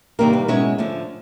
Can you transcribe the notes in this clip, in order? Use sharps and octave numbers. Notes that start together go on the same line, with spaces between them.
C3 D#3 G3 A#3 D#4 A#4
B4
B2 G#3 C#4 E4 C#5
D3 F3 A3